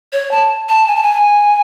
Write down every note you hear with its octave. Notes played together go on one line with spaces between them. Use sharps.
C#5
A5
A5
G#5
A5
G#5